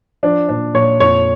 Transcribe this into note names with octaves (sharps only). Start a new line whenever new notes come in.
F3 D4
A#2 D4
A#2 C#5
F2 C#5